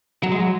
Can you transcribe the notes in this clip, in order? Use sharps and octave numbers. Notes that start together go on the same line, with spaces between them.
F#3
G#3
F#3